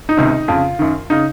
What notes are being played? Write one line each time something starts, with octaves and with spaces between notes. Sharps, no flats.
D#4
C#2 C3 D#3
F2 C#3 F4
F#2 D#3
C#3 D#4